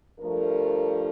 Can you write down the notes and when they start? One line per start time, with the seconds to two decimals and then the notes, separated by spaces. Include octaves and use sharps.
0.18 G2 F3 A3 A#4